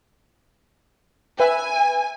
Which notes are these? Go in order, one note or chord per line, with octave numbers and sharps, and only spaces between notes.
B4 E5 G#5